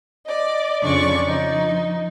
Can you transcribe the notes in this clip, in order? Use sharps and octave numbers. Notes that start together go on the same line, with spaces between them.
D5 D#5
F2 C#3 F3 D4 D5 C#6
F3 D#4